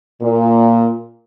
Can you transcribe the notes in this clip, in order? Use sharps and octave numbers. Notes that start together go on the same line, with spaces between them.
A#2